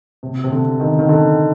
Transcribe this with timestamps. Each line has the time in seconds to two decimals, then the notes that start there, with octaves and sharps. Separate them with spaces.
0.23 C3
0.44 C3
0.52 D3
0.80 D#3
0.99 D#3
1.09 D3